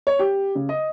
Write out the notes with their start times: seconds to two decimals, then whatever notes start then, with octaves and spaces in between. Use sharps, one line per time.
0.07 C#5
0.19 G4
0.55 C#3
0.69 D#5